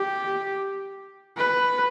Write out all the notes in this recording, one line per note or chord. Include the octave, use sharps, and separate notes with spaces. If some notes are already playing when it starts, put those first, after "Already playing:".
Already playing: G4
B4